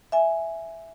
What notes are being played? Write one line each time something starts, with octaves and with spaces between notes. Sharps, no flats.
E5 G#5